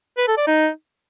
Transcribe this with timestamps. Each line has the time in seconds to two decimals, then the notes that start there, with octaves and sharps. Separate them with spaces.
0.18 B4
0.28 A4
0.37 D5
0.47 D#4